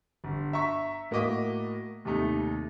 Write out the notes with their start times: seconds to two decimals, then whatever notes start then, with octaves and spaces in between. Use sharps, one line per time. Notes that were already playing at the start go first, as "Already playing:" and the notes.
0.24 G1
0.53 E5 A#5 C#6 B6
1.11 A2 A#3 F#4 D#5 D6 B6
2.05 D#2 C3 A3 D#4